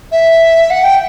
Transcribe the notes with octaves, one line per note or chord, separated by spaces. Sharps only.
E5
F#5
G5